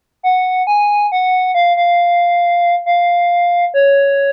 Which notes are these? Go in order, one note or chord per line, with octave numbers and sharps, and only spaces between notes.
F#5
G#5
F#5
F5
F5
F5
C#5